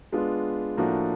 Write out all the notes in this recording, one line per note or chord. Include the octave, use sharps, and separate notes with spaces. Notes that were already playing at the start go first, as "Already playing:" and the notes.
G#3 B3 D4 F4
A2 F3 A#3 D4 F#4